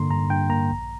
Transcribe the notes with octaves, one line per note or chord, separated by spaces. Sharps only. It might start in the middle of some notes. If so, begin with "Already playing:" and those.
Already playing: G2 D3 A#3 A#5 C6
G2 A#5
G2 G5
A#3 A#5
A#1